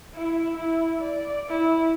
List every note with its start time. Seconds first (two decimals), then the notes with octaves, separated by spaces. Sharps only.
0.14 E4
0.57 E4
1.01 D5
1.49 E4